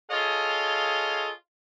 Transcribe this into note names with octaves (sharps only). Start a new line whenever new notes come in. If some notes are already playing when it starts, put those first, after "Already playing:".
F4 G#4 A4 C#5 D#5 F5